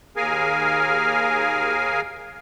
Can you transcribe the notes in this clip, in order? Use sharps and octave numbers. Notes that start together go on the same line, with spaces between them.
D#2 G#4 A#4 F5 G#5